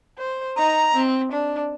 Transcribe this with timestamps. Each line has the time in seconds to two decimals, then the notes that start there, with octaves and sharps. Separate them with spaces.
0.19 C5
0.56 D#4 A#5
0.95 C4
1.32 D4